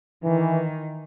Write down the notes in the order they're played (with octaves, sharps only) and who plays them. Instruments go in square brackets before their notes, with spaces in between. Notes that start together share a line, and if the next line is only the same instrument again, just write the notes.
[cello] D#3 [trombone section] E3